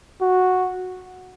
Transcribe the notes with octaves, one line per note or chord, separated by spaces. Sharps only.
F#4